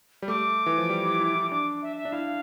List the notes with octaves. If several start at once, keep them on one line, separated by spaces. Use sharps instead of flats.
G3
A3 D6
E3
F3
G3
E4
E4
E4
D4 D6
E5
E5
D4
E4 F5